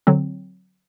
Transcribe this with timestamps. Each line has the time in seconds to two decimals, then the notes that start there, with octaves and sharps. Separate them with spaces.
0.07 D3 F#3 C4